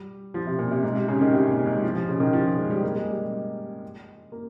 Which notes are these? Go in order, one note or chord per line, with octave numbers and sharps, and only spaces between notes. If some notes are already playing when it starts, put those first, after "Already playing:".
Already playing: G3
F3
C3
A#2
C3
G#2
C3
C#3
D#3
C3
A#2
G#2
F3
F3
C#3
D#3
F3
G#3
G3
A#3
G#3
G3
A#3